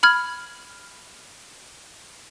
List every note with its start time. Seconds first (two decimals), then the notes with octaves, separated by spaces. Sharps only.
0.03 B5 F6 G#6